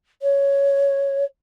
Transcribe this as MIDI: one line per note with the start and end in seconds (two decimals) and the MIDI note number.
0.22 1.24 73